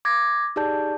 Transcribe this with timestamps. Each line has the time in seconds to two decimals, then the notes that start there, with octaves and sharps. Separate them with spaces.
0.05 D6 G#6 A#6
0.56 D#4 G4 G#4 D5 A5 G6